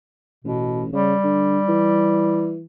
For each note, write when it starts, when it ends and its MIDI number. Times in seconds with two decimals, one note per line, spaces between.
0.44 0.90 33
0.44 0.84 47
0.92 1.14 49
0.92 2.58 55
1.23 1.58 50
1.69 2.64 52